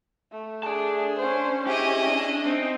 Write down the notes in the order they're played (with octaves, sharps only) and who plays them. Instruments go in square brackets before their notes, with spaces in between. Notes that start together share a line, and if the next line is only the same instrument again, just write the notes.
[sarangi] A3
[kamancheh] G#4 [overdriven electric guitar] D5 A5
[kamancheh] C#4 C5
[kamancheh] C#4 [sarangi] E4 [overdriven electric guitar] G4 [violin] G#4 D#5
[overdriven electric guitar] D4
[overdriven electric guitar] C4 [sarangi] D#4